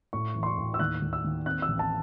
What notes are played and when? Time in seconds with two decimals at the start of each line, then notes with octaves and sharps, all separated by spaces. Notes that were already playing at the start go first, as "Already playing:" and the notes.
0.13 A2 C#6
0.35 E3
0.43 C6
0.46 C#6
0.58 A2
0.74 E6
0.79 D#2 F#6
1.02 D#2
1.13 E6
1.24 D#2
1.46 C4 F#6
1.62 E6
1.68 A1
1.79 A5